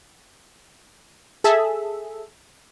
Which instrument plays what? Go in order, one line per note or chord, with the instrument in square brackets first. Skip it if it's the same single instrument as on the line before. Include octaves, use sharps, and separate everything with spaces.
[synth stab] G#4 A4 E5